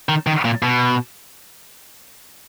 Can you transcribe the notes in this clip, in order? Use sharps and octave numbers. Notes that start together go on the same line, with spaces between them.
D#3
D#3
A#2
B2